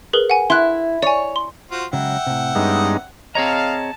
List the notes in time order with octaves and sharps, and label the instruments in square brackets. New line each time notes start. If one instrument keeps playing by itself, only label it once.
[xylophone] G#4 A#4 B4
F#5 G#5
[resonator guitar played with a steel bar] E4 [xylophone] C6 F#6
[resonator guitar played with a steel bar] C#5 [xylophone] D5 G#5
[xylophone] C6
[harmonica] F4 F#4 C5
[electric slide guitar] C#3 F#3 G#3 [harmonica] E5 F#5 G5
[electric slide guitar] A2 C3
[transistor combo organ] G2 G#3 D#4 [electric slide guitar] B3 C#4
[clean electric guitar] C4 A#5 [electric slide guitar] G#4 C#5 D#5 [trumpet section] F5 [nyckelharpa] A5